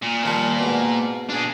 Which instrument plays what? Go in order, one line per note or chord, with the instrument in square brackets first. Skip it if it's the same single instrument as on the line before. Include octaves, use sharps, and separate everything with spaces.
[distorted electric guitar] A#2
[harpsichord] D#2 F3 G3 [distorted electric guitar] A#2
[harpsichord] G#2 B2
[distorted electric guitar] D4 G#4